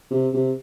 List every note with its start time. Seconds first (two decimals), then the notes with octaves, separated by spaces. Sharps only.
0.11 C3
0.34 C3